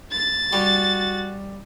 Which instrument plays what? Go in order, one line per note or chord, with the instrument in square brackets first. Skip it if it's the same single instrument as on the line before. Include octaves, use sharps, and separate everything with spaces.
[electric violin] A6
[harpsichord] G3 [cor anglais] F#4